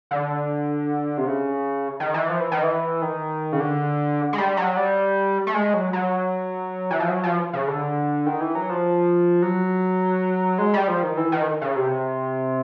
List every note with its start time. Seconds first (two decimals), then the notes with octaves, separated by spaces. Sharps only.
0.11 D3
1.18 C3
1.27 C#3
2.00 D#3
2.14 E3
2.29 F3
2.40 E3
2.52 D#3
2.63 E3
3.02 D#3
3.53 C#3
3.60 D3
4.33 G#3
4.38 G3
4.57 F#3
4.77 G3
5.47 A3
5.54 G#3
5.74 F#3
5.93 F#3
6.91 E3
7.00 F3
7.09 F#3
7.23 F3
7.53 C#3
7.68 D3
8.26 D#3
8.41 E3
8.55 F#3
8.70 F3
9.42 F#3
10.58 G#3
10.73 G3
10.88 F3
11.03 D#3
11.17 E3
11.32 D#3
11.61 C#3
11.76 C3